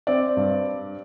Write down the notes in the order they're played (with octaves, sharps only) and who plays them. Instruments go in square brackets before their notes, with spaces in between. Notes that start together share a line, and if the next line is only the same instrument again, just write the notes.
[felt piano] C4 D5
G2